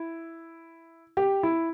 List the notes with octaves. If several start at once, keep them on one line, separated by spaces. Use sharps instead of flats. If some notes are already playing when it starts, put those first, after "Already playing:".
Already playing: E4
G4
E4